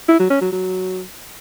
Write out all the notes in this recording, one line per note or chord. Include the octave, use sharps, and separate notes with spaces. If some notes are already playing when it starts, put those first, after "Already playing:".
E4
F#3
C#4
F#3
F#3